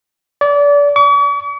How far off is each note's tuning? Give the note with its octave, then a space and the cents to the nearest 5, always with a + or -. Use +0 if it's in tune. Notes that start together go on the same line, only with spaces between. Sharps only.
D5 -30
C#6 +45